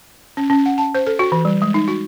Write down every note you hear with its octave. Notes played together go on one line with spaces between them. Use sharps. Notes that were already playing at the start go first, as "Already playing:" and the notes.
C#4
C#4
F#5
A5
C5
A4
F#4
E3
G3
G#3
D#4
F#4